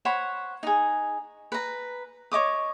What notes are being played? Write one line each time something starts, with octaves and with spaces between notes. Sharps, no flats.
C5 C#5 F#5 B5
D#4 G#4
B4 A#5
C#5 D#5 D6 D#6